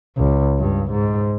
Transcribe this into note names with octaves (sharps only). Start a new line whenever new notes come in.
C#2
G2
G#2